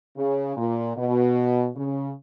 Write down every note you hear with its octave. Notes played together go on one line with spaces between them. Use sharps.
C#3
A#2
B2
C#3